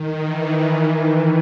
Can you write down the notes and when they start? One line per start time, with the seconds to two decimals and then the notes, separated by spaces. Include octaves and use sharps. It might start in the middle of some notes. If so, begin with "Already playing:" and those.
Already playing: D#3
0.23 E3